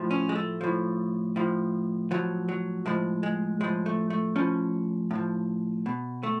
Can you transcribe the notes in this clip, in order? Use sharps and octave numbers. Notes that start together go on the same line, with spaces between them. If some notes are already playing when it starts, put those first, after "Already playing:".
Already playing: A2 F3
C#4
G#3
A3
A2 F3
A2 F3
A2 F3 F#3
F#3
A2 F3 G#3
G#3
A2 F3 G#3
A3
A3
A2 F3 C#4
A2 F3
B2
A3